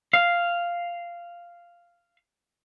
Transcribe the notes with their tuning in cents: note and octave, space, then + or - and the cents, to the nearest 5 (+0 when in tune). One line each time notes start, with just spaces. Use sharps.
F5 -5